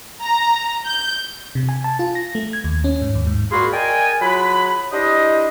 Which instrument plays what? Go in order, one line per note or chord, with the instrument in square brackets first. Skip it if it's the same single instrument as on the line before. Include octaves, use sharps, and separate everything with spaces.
[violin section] A#5
G6
[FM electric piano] C3
G#5
A5
F4
A#6
A3
G#6
D#2
C#4
G#2
D#2
G#2
[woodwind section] A#2 F#4 G#4 F5 B5 C6
G#4 A#4 D5 D#5 G5 G#5
F#3 F4 G#4 B4 B5
D4 E4 G4 C5 D#5